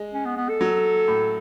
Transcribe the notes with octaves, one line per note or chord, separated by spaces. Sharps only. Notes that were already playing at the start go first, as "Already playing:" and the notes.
Already playing: G#3
C#4
B3
B3
A4
F#3
A2